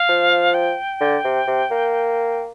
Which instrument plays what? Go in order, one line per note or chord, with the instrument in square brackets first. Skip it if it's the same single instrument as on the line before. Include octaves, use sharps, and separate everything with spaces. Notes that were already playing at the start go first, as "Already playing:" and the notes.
Already playing: [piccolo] F5
[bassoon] F3
[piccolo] G5
[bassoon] D3
C3
C3
A#3